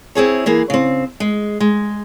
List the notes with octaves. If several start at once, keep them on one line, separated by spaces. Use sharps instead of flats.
C4 E4 G#4 C#5
E3 A#3 G#4
C#3 C4
G#3
G#3